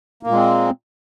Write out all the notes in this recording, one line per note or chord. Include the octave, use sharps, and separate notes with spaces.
A#2 G#3 A#3 C4